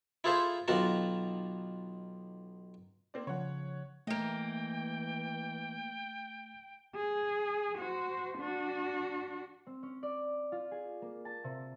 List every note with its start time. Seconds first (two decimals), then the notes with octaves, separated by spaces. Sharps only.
0.24 E4 F4 G#4 A4 C5 E5
0.68 B1 D#3 F4 F#4 A5
3.14 A#3 C4 D5
3.27 C#3 F3 C#5 F#5
4.07 E3 A3 A#3 D#5 G5
6.96 G#4
7.78 F#4 C5
8.38 D4 F#4
9.67 C4
9.83 C#4
10.03 D5
10.52 F4
10.71 G#4
11.02 A#3
11.25 A5
11.44 C3